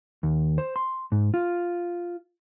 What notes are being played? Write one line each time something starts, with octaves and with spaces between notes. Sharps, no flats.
D#2
C5
C6
G#2
F4